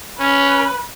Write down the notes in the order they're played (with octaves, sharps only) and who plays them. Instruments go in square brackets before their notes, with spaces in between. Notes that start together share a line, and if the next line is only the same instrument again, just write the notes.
[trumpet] C#4 [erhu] B4